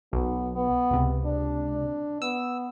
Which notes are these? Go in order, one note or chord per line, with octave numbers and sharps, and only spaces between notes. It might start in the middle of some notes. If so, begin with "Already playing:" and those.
B1 B3
B3
C#2 C3
D4
B3 E6